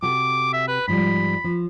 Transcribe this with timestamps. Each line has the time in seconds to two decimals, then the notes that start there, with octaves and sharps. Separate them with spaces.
0.02 C3 F#4 A4 D6
0.53 E5
0.68 B4
0.88 G#2 F3 G3 B5
1.44 F3